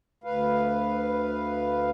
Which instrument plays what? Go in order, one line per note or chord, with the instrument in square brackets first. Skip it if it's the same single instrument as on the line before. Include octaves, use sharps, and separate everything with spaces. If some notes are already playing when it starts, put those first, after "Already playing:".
[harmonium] D2 B4 F5